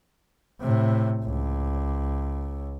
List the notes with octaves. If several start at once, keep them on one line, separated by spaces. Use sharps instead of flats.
A2 C3
C#2